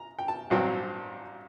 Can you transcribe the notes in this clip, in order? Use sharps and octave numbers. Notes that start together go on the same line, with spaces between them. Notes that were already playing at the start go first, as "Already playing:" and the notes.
Already playing: A#5
G5
A5
A1 G2 F#3 C4